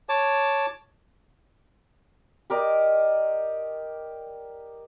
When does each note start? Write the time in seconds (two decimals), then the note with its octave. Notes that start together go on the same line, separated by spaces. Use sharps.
0.09 C#5 A5 D6
2.50 G4 A#4 D5 D#5